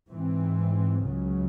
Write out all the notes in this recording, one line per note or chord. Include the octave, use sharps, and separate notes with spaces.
G#2 E3 C4
C#2 C#3 F#3